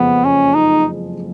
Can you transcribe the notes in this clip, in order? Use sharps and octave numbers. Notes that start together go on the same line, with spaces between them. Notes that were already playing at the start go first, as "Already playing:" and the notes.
Already playing: F#1 F2 F3 G#3 B3
C#4
D#4